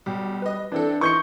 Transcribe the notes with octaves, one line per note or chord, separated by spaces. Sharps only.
B1 G3
B4 D#5
E3 C4 D4 A4
E3 D#4 C6 C#6 G6 C#7